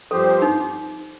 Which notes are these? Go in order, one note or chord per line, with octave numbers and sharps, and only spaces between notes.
G2 F3 C4 G4 A4 C5
D#4